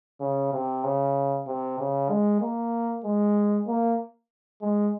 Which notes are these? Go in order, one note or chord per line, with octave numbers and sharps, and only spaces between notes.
C#3
C3
C#3
C3
C#3
G#3
A#3
G#3
A#3
G#3